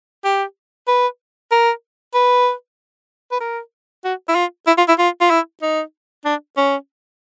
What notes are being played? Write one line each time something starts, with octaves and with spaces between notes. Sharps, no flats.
G4
B4
A#4
B4
B4
A#4
F#4
E4
F4
E4
F4
E4
F4
F4
E4
D#4
D4
C#4